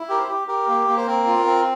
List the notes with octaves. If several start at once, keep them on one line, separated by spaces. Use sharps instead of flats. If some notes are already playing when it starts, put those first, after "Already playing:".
Already playing: E4
G4 A#4
C5
G4
G4 A#4
A#3
A#3
C5
C4 A#4
F4
C4